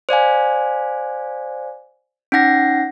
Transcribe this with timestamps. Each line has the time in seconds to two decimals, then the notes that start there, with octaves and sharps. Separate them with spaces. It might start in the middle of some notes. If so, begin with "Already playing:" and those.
0.09 C5 D5 F5 G#5
2.32 C#4 D#4 F#5 A#6